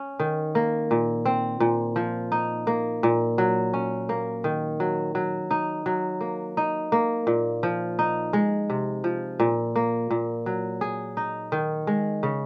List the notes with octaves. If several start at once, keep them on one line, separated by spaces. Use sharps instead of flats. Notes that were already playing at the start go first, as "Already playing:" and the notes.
Already playing: C#4
D#3
A#3
A#2
C4
A#2
F3
D#4
A#3
A#2
F#3
C#4
A#3
D#3
F#3
F#3
D#4
F#3
A#3
D#4
A#3
A#2
F3
D#4
G#3
C3
F3
A#2
A#3
A#2
F#3
G#4
D#4
D#3
G#3
C#3